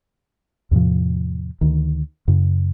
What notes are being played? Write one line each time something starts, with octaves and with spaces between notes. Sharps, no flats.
E2 A2 C3 F3
D2 D#3
F#2 C#3